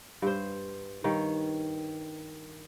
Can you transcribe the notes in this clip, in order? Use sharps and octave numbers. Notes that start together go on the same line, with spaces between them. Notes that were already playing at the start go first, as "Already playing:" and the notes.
G2 C5
G2 D#3 C#5